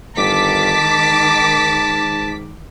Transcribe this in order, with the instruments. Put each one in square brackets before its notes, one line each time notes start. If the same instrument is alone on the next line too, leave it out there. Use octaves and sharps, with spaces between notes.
[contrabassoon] G1 [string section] D#3 D6 B6 [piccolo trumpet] A5
[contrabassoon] G#2